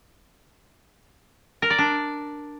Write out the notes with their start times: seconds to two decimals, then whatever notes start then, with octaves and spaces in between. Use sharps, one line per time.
1.62 A#4
1.70 D5
1.78 D4